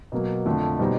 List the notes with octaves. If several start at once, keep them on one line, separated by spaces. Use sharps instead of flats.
B2 F#3 A#3
F2 D3 F3 A3
B2 G3 C4 D#4